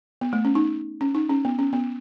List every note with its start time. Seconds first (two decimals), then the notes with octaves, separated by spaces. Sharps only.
0.21 B3
0.33 A3
0.45 C#4
0.55 D#4
1.01 C#4
1.15 D#4
1.30 C#4
1.45 B3
1.59 C#4
1.73 B3